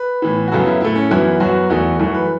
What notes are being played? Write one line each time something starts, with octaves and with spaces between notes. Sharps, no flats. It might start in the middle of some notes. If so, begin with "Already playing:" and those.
Already playing: B4
A2 E3 B3
F#4
F#2 C#3 F#3 B3 A4
E4
A2 A3 E4
C#4
F#2 E3 B3 E4
F#2 F#3 B3 F#4
E2 E3 A3 F#4
F#2 E3 A3 F#4
B4